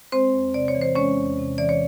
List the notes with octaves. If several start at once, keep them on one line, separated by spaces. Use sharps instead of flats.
G#3 C4 C5
E2
C3 D5
C#5
E3
C5
G#3 C#4 C#5
E2
C3
E3 D5
C#5